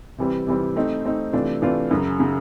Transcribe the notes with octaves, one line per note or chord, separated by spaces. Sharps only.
C3 E3 G3 C4
C3 E3 G3 C4
A3 C4 D#4
A3 C4 D#4
C3 E3 A3 D4 F4
C3 E3 A3 D4 F4
F#2 C#3 F#3
C#3 F#3